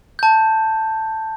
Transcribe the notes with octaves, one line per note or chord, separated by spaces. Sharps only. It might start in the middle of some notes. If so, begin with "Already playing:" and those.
A5 G6